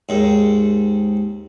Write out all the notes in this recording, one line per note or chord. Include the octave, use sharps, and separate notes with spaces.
D#2 G#2